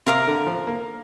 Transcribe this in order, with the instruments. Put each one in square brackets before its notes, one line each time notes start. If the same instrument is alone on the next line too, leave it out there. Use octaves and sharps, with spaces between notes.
[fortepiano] C3 [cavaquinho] A#4 F5 A#5 D6
[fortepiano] D3
F3
A#3